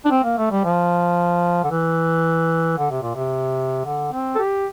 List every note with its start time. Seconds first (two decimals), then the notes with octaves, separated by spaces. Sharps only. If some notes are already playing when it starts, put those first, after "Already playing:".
0.05 D4
0.11 C4
0.24 A#3
0.38 A3
0.51 G3
0.65 F3
1.64 D3
1.71 E3
2.78 D3
2.91 C3
3.02 A#2
3.15 C3
3.85 D3
4.12 C4
4.35 A4
4.39 G4